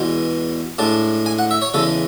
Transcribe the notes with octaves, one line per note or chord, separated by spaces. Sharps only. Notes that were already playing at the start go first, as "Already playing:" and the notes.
Already playing: E2 B2 G#3
A2 G#3 D4 A5
G#5
F#5
E5
C#5
E2 C#3 E3 G#3 A4